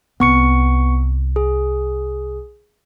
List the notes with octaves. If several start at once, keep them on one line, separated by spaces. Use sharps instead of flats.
C2 B3 C#6 C#7
G#4